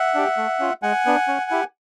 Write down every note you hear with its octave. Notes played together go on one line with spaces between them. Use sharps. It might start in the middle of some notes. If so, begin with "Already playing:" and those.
Already playing: E5 F#5
D4 G4
A3
C#4 F4
G#3 F#5 G#5
B3 D4
C#4
E4 G4